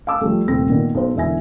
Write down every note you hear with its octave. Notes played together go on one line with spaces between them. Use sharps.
F5 G#5 A5 D6 E6
F3 G3 A3
D#1 C2 A3 C4 A#6
A#2 D#3 B3
B1 C5
E1 D3 E4 E5 G#5 A#6